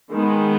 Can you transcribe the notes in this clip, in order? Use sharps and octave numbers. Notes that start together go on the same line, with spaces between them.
D#3 G#3 B3